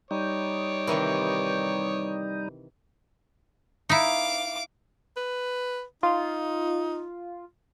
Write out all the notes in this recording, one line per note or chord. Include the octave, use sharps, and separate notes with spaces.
G3 D#4 C#5 D6
C3 D#3 E3
D#4 E4 F5 D6
B4
D#4 F4